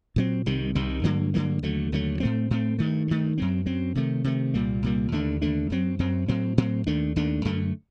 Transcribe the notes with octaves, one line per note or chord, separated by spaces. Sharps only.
A#2 F#3 C4
C2 C3 D#3 G3
C2 C3 D#3 G3
G2 D3 F#3 A#3
G2 D3 F#3 A#3
D#2 D3 F#3 A3
D#2 D3 F#3 A3
A2 A3 C4
A2 A3 C4
G2 D#3 A3
G2 D#3 A3
F#2 F#3 C4
F#2 F#3 C4
C3 D#3 A3
C3 D#3 A3
C2 A#2 G3 A#3
C2 A#2 G3 A#3
D#2 D3 A3 D4
D#2 D3 A3 D4
F#2 F#3 C4
F#2 F#3 C4
A2 F#3 C4
A2 F#3 C4
D#2 D#3 A3 D4
D#2 D#3 A3 D4
F#2 D3 A3